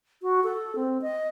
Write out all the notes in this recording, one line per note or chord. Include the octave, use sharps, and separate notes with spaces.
F#4
A4
C4
D#5